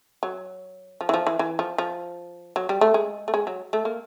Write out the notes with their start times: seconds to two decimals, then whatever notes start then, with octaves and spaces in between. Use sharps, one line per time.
0.23 F#3
1.01 F3
1.09 E3
1.14 F3
1.27 E3
1.39 E3
1.59 F3
1.78 F3
2.56 F#3
2.69 G3
2.81 A3
2.94 G#3
3.28 A3
3.34 G#3
3.47 F#3
3.73 A3
3.85 A#3